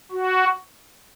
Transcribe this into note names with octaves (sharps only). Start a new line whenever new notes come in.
F#4